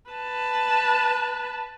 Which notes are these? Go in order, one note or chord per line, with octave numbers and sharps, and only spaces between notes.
B4 A5